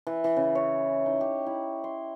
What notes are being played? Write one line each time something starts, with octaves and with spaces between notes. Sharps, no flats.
E3
E3
C#3
C#5
D#4
G4
E4
C6